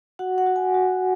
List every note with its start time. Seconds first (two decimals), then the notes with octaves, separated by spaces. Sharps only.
0.19 F#4 F#5
0.38 F#5
0.46 F#4
0.56 G#5
0.74 F#4